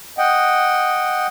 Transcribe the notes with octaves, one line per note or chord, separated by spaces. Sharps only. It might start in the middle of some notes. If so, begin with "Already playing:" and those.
D#5 F#5 G5